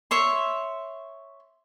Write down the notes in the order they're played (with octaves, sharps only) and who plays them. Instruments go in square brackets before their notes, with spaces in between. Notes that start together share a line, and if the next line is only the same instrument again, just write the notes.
[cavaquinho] C#5 E5 C6